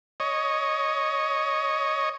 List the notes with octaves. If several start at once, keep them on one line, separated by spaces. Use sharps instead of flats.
C#5 D#5